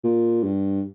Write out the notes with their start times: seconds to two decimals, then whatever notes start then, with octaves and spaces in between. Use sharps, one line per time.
0.04 A#2
0.44 G2